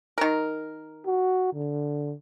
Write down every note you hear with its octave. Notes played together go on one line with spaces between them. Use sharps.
D#3 A#4
F#4
D3